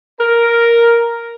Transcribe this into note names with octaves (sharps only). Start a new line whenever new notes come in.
A#4